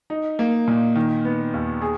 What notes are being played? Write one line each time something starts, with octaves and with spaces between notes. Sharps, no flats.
D#4
A#3
A#2
D#3
B3
D#2
G#4